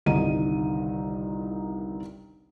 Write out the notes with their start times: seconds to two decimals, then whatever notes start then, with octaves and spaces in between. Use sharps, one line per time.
0.06 G1 C2 D#3 D#4 D#7